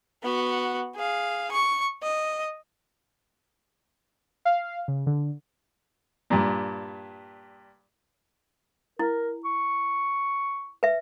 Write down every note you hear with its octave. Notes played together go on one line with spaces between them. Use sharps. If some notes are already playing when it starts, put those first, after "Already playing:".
B3 F#4
G#4 F5
C#6
D#5
F5
C#3
D3
G2 A#2
E4 A#4
C#6
B4 E5